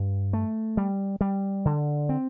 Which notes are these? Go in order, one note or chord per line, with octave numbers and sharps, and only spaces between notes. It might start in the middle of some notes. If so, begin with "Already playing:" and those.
Already playing: G2
A3
G3
G3
D3
C4